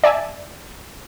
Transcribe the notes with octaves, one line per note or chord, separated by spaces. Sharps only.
D5 E5 G#5 A5